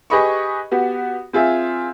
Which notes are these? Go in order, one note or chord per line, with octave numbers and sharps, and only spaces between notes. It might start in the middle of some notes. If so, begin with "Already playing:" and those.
G4 G#4 B4 D#5 B5 C#6
B3 F#4 G4
C4 F4 G#4 E5